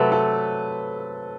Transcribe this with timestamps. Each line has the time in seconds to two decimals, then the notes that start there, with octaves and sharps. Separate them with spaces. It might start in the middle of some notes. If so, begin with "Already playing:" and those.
Already playing: C3 F#3 A3 A4 B4
0.12 A4